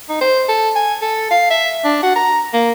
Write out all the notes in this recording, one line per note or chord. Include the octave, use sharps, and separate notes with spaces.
D#4
C5
A4
G#5
A4
F5
E5
D4
F#4
A#5
A#3